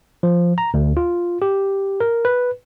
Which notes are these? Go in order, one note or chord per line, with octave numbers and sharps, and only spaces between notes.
F3
A#5
D2
F4
G4
A#4
B4